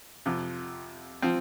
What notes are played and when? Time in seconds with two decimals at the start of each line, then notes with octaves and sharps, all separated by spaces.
0.26 F2 C3 F3
1.22 F3 C4